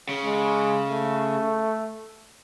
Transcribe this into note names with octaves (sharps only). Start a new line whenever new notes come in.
C#3
G#3
A3